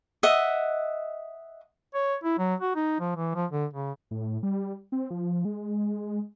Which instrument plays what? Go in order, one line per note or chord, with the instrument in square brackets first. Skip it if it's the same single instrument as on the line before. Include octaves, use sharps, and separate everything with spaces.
[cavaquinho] D#5 E5 F#5
[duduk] C#5
E4
F#3
F#4
D#4
F3
E3
F3
D3
C#3
[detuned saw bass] A2
G3
C4
F3
G#3